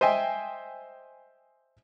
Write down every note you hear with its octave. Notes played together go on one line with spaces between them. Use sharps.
C5 D#5 E5 G5 G#5